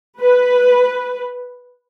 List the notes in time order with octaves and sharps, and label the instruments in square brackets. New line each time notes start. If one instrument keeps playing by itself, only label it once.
[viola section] B4